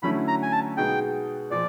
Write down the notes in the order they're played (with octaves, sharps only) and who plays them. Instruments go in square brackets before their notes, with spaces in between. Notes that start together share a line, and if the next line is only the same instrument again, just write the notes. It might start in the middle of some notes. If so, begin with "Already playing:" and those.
[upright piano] D3 F#3 A3 C#4 E4 [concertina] B5
[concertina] A#5
G#5
A5
[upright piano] B2 G#3 B3 D#4 G#4 [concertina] G5
[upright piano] A#2 F3 [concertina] D5